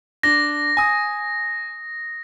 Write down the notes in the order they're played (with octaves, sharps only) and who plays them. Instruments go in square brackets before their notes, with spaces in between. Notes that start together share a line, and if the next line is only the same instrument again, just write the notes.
[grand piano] D4 [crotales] A#6
[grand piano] G#5 D#6